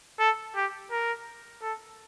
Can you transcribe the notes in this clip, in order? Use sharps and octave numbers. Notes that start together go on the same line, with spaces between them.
A4
G4
A#4
A4